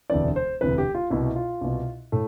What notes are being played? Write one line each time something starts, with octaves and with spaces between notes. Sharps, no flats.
E1 D2 C3 E3 D5
C5
E1 D2 C3 E3 B4
G4
F4
C2 B2 E4
F4
C2 B2
A2 A3